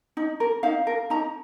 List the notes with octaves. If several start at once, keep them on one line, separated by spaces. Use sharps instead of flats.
D#4
A#4
D#4 F5
A#4
D#4 A#5